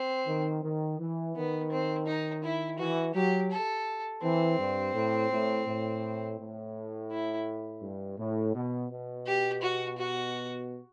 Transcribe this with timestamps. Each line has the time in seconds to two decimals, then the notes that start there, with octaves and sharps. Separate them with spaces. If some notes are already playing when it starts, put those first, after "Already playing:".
Already playing: C4
0.27 D#3
0.64 D#3
0.99 E3
1.35 D#3 B3
1.71 C4
2.06 D#4
2.44 E4
2.78 E3 F#4
3.14 F#3 G4
3.51 A4
4.22 E3 C4
4.59 G2
4.94 A2
5.31 A2
5.66 A2
6.38 A2
7.11 E4
7.82 G2
8.18 A2
8.54 B2
8.90 B2
9.26 G4
9.62 F#4
9.98 F#4